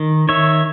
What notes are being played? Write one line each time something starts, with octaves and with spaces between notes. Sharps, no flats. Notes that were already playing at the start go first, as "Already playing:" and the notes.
Already playing: D#3
D#3 C#5 E5